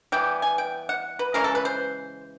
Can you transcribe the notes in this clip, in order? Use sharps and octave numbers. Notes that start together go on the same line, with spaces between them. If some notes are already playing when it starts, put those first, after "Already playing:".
E3 G3 B3 G5
G#5
G5
F#5
B4
C#3 E3 G#3 C#4 A#4
A4
B4
C5